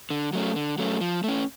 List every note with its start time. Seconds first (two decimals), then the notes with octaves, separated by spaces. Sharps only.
0.10 D3
0.33 F#3 A3 C#4
0.56 D3
0.78 F#3 A3 C#4
1.01 F3
1.24 A3 C#4